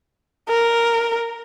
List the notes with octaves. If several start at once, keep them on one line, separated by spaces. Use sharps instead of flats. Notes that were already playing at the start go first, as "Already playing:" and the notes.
A#4